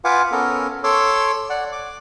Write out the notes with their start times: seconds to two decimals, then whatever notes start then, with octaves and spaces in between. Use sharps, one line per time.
0.05 F4 B4 F5 F#5 G#5 D6
0.32 B3 C#4 A4 A#4
0.84 A4 C#5 C6 D6 E6
1.50 D5 F#5
1.72 D6